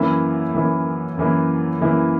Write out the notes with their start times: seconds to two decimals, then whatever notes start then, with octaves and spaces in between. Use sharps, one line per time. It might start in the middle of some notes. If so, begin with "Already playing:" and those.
Already playing: F#2 E3 A#3 E4
0.54 F#2 E3 A#3 E4
1.18 F#2 E3 A#3 E4
1.81 F#2 E3 A#3 E4